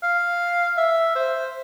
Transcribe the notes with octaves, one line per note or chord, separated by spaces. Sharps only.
F5
E5
C5